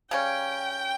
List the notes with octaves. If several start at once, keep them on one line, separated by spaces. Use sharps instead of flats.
C#3 G3 C#4 G5